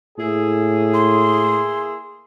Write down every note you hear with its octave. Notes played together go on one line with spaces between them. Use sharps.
A2 A#3 E4 G#4
C6